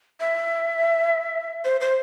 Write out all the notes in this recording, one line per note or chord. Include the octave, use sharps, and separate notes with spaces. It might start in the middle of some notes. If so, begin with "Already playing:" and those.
E5
C5
C5